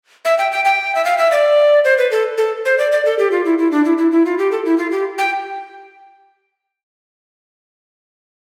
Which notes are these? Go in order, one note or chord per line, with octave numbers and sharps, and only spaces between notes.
E5
G5
G5
G5
E5
F5
E5
D5
C5
B4
A4
A4
C5
D5
D5
A4
G4
F4
E4
E4
D4
E4
E4
E4
F4
G4
A4
E4
F4
G4
G5